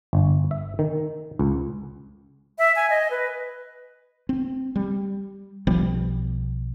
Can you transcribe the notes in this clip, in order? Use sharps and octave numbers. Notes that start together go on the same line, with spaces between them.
G1
E5
D#3
C#2
E5
G#5
D#5
B4
C4
G3
B1 F3 G3 B3